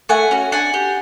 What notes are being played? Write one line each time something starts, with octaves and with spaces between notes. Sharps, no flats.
A3 F#5 G#5
C#4 F#4
D4 F#5 G#5
G4